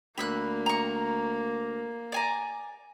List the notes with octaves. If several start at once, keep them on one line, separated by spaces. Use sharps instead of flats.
D2 A#3 B5 E6 F#6
A#5 C#6
D5 G#5 A#5